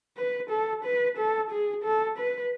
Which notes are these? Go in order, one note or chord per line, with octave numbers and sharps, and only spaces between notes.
B4
A4
B4
A4
G#4
A4
B4